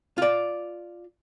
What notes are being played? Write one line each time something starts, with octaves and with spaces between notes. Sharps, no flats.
F4 D5